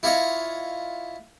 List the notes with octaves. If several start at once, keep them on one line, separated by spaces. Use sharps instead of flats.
E4 F4 C#5 D#5